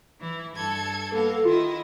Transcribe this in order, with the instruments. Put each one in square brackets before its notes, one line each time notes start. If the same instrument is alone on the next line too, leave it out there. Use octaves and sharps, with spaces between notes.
[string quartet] E3 E4
G2 A4 G#6
[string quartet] A#3 B3 F5 [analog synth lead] A4
[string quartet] D#3 E4 D#5 [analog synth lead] F4